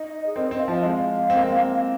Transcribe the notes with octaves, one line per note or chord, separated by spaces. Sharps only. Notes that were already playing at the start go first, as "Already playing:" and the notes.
Already playing: D#4 D#5
G#4
C4 A#4
C4 D#5
F5
F3 D#5
G#3 F5
C4
A#3
C4
F5